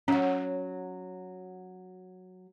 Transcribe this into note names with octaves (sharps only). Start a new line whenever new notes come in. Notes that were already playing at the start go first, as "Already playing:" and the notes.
F#3 C#4 F#4